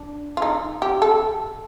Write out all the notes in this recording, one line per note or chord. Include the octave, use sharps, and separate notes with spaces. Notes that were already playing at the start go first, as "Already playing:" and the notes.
Already playing: D4
F4
D#4
G4
A4